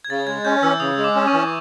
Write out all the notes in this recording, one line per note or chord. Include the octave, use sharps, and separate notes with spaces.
G#6
C#3 A6
G#3 G#6
C#4 G6
E3 E6
C#3 D#6
G#3
D6
C#4
C#6
E3